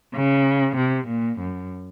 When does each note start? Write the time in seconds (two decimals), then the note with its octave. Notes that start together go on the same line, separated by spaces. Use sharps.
0.15 C#3
0.76 C3
1.08 A#2
1.39 F#2